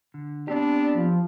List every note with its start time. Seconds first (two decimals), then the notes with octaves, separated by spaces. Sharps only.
0.14 D3
0.48 B3 C4 D4 G4
0.95 F3